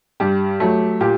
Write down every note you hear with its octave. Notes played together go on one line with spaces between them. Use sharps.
G2 G4
F#3 A3
A#2 G4